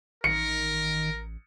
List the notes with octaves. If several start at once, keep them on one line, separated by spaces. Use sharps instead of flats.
A1 D#3 A#4 C#7